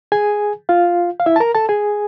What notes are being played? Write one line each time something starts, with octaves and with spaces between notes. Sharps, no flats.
G#4 G#5
F4 F5
F5
E4 E5
A5
A#4 A#5
A4 A5
G#4 G#5